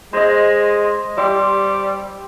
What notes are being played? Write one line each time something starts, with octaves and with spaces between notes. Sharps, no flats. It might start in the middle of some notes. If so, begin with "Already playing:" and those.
G#3 C5 D#5
G3 G4 C6 E6